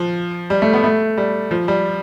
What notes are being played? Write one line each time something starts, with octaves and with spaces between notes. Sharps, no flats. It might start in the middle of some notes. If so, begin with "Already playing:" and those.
Already playing: F3
G3
A3
B3
A3
G3
F3
G3